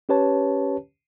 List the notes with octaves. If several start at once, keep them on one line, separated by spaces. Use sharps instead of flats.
C#4 G4 B4 C#5 A5